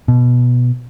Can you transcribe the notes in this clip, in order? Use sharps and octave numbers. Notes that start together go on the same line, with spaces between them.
B2